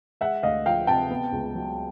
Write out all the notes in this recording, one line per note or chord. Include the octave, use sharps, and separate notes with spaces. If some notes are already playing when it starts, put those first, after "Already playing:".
G#3 E5 F#5
D2 D#5 F5
F3 F5 G5
C3 G5 A5
B3
C#2
F#3